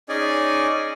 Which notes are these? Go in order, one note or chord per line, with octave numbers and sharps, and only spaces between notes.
C#4 D#4 G#4 D5 D#5 G#5